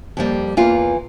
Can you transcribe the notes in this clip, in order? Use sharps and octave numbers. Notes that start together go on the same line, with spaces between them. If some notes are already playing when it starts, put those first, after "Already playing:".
F2 E3 G3 A#3
E2 E3 A#3 F4